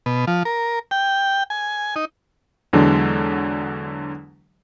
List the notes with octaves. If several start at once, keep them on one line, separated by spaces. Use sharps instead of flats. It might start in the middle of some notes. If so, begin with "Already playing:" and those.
B2
F3
A#4
G5
G#5
D#4
E2 D3 F#3 G#3 D4